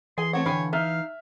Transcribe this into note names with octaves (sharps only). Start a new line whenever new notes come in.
E3 G#4 G#5 C6
A3 C4 C#5 F#5
D3 F5 G5 G#5 B5
D#4 E5 F5 F6